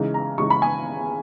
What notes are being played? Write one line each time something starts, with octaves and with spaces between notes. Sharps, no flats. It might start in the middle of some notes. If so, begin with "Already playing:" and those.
Already playing: C#3 E3 G#3 D#4
A#5
C#3 E3 G#3 D#4 C#6
B5
G#5